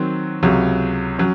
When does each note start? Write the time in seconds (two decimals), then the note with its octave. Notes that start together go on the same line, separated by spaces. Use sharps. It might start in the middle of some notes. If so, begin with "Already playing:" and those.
Already playing: D#3 F#3 C4
0.43 C#2 C3 F#3
1.19 F#3 C#4